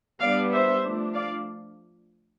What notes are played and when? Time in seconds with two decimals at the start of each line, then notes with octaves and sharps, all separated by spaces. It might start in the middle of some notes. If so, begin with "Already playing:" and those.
0.21 G3 B3 D4 D5 F5
0.53 C5 E5
0.84 F3 A3 D4
1.15 D5 F5